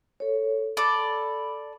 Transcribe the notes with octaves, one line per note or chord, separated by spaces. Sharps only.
A4 C#5
A4 D5 B5